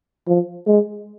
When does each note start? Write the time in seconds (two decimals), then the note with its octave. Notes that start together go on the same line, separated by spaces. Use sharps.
0.27 F3
0.67 G#3